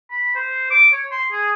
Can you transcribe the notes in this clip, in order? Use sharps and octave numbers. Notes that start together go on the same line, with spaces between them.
B5
C5
D6
C#5
C6
G#4